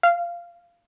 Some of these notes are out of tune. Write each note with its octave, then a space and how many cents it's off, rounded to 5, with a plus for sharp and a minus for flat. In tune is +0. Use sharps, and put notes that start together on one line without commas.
F5 -15